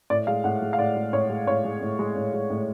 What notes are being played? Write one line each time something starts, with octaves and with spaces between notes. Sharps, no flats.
A2 D5
G#3 F5
A2 F#5
G#3
F5
A2 D5
G#3
A2 C#5
G#3
A2 C#5
G#3
A2
G#3
A2
G#3
A2